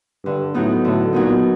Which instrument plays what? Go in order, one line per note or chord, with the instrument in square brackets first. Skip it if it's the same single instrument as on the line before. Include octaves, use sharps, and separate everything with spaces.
[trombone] G2 [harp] D3
[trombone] A2 [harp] F#3 B3 D#4
[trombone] A2 [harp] D3
[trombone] A#2 [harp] F#3 B3 D#4